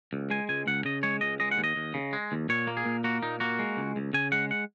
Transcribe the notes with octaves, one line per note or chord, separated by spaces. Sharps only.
C#2
G#3 G#5
C#2 G#5
C#2 F#5
C#3 D#5
G#3 C#5
C#2 D#5
G#3 D#5
F#5
D#2
D#5
D#2
C#3
G#3
D#2
A#2 C#5
A#3
G#4
A#2
A#3 F#4
A#2 D#4
A#3 F#4
G#3
C#2
C#2
C#3 G#5
G#3 F#5
F#5